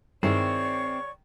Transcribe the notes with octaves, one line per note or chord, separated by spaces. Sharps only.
G2 D#3 G#3 C4 E4 C#5 D5 C#6